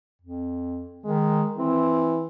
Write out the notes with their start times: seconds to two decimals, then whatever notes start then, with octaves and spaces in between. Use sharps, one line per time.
0.22 F2
1.05 D#3 G#3
1.57 E3 C4